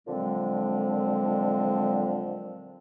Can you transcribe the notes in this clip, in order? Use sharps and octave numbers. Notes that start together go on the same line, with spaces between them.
A#2 D3 F3 F#3 G#3 C4